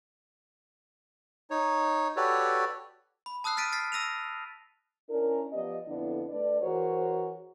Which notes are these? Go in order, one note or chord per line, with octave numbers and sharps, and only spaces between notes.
D#4 C#5
F#4 G4 A4 B4 C#5 D5
B5
A5 D#6 E6 F#6 C7
F6 A6 B6 D7 D#7
F6 A6 B6 C7
E6 A#6 D#7 F7
C#4 D4 E4 A#4
F3 B3 G4 D5 D#5
F2 D3 B3 D4 E4
A3 D4 B4 D5
E3 F#4 G#4 A#4 C5 C#5